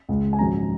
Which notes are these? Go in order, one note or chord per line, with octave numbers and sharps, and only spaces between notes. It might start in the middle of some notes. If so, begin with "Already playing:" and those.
C#2 C#3 G#3
G#5
A#1 G#2 D#3 F#3 C#4 A#5